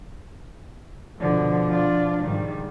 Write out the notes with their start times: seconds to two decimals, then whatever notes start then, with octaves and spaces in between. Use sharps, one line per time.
1.20 B2 D3 F3
1.69 D4 F4
2.23 G#2 D#3 G3